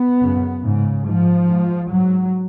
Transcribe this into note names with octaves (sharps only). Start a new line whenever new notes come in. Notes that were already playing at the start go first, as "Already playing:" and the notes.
Already playing: B3
F#2 C#3
G#2 C#3
G#2 F3
G#2
G#2 F#3